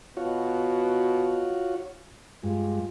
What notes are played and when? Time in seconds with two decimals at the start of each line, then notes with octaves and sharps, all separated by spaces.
0.17 B2 F4 F#4 C#5
2.43 G2 G#3 F4